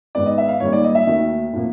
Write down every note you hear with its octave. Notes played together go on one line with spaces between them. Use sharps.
G#2 D#3 G#3 B3 D5
D#5
E5
F5
G#2 D#3 G3 A#3 C#5
D5
D#5
E5
D#2 D#3 F#3 A3
A2 F3 A#3